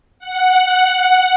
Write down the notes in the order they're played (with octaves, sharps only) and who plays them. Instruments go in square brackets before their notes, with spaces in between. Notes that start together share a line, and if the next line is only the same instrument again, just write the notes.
[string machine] F#5